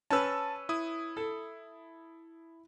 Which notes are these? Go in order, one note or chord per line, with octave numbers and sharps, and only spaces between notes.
C#4 B4 A5 E6
E4 D#6
A4